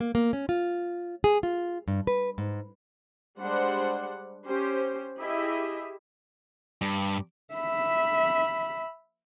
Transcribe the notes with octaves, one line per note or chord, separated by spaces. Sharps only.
A#3
A#3
C#4
F4
G#4
F4
G2
B4
G#2
G3 G#3 D4 C5 F#5
C#4 G4 C5
E4 G4 G#4 D#5 E5
G2
E5 B5